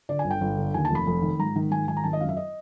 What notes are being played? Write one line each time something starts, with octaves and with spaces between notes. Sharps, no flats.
D3 D5
G#5
G1
G5
G1
D3
D#2 G#5
A5
F1 B5
F1
D#3
G#2 A#5
D#3
G#2 G#5
D#3 G#5
A#5
G#1 A5
D#5
F#2 F5
E5
D#5